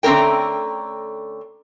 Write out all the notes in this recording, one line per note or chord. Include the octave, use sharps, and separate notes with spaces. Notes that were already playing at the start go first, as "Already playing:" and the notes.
D3 A3 C4 C#4 A#4 G5